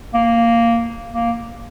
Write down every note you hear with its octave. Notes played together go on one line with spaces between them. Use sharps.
A#3
A#3